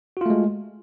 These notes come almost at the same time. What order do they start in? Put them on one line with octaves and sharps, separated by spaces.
F#4 F4 A3 G#3